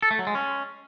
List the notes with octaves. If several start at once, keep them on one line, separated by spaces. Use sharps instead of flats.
A4
A3
F#3
G#3
C#4